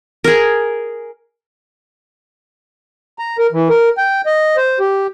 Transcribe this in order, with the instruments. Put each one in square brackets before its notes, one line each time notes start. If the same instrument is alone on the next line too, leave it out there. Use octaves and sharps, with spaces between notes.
[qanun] G#4 A#4
[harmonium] A#5
A#4
E3
A#4
G5
D#5
C5
G4